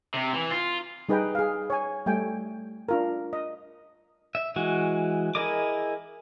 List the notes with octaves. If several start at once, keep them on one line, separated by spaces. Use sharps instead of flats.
C3
E3
F4
G3 D#4 G#4 B4 D#5 G5
G#4 F5
C#5 G#5
G3 A3 G5 G#5
D4 F4 A#4
D#5
E5
E3 G#3 F#4
E4 G#4 A#4 D#5 D6